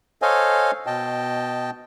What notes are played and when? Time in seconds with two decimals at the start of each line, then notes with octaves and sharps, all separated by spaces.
0.22 A4 C5 C#5 D#5 F5 G#5
0.86 B2 D#5 G5 A5